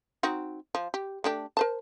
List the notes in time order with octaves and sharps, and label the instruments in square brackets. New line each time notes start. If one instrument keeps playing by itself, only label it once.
[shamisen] C4 D#4 F#4
F3
G4
A3 D4 G4
A#4 C5 A5